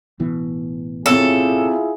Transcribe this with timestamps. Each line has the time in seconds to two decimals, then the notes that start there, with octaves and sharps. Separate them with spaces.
0.19 A1 B2 E3
1.06 C3 E4 F4 G#4 A4 C#5